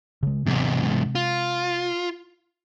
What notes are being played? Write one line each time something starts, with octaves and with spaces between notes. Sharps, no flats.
C#3 G#3
E2 G#2 C3 G#3 C4
F4